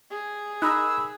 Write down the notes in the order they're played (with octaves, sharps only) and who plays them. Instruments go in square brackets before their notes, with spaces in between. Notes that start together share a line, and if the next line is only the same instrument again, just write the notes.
[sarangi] G#4
[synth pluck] D#4 A#4 [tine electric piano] B5 D#6 F#6 [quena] E6